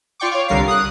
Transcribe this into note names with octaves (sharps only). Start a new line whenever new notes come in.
F4 D5 G5 C#6 D6
C#5 F5
C2 D3 G3 A#4 F5 C7
D#6 F#6